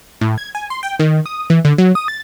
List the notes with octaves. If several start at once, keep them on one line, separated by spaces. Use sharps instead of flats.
A2
G#6
G#5
C6
G5
D#3
D#6
E3
D3
F#3
D#6
A6